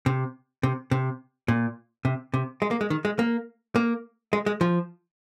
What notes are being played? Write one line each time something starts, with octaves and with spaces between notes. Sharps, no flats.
C3
C3
C3
A#2
C3
C3
G#3
A#3
G#3
D#3
G#3
A#3
A#3
G#3
G#3
F3